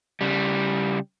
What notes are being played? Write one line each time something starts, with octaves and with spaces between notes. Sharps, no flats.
C#3 G3